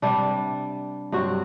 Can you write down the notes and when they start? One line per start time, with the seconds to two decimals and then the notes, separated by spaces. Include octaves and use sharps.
0.02 C3 G3 D4
1.12 G2 F#3 C4 F#4